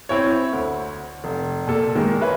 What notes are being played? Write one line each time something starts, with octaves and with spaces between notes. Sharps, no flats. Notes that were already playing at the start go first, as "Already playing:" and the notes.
C4 E4 C#5
D2
F1
A#2 A4
D#3 G#3 A#3
B4 C#5 E5